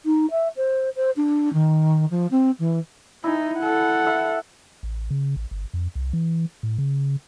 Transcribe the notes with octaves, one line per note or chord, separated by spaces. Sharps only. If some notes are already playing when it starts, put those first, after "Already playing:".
D#4
E5
C5
C5
D4
D#3
F3
C4
E3
D#4 E4 G#5
A4 F#5
E5 B5
A1
C#3
A1
G1
F2
C2
E3
A2
C#3